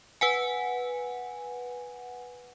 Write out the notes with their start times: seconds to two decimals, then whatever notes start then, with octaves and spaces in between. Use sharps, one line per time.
0.21 B4 F#5 G#5